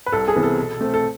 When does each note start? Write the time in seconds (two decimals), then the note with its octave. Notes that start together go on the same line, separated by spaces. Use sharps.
0.06 B4
0.12 C2 A4
0.28 G#4
0.35 C3 E3 B3
0.43 A4
0.58 B2
0.81 A3 C4
0.94 A4